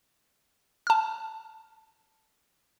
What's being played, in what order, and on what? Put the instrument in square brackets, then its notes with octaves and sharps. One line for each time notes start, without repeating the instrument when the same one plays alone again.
[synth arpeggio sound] A5 F6